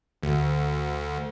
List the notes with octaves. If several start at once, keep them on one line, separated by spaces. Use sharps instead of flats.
D2